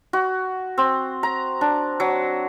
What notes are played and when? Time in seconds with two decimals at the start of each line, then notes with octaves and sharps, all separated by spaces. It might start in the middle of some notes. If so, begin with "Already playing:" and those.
0.13 F#4
0.78 C4
1.23 A#5
1.61 D4
2.00 F#3